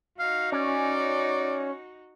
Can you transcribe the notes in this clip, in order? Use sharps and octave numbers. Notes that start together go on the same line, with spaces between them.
D#4 F#4 F5
C#4 D5